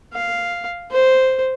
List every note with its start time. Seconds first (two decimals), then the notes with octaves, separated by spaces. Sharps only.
0.13 F5
0.91 C5